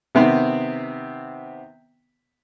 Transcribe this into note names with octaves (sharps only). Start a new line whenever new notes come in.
C3 D#3 B3 C4